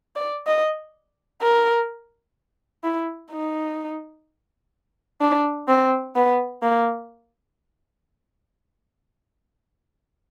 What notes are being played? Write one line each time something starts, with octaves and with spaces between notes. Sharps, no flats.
D5
D#5
A#4
E4
D#4
D4
C4
B3
A#3